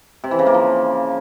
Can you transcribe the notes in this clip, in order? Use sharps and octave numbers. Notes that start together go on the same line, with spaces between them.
C3
E3
C#3
A#3
F3